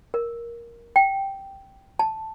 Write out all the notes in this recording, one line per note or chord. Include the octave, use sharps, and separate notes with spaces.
A#4
G5
A5